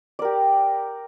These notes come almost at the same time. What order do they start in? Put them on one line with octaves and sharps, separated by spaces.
D5 A#4 G4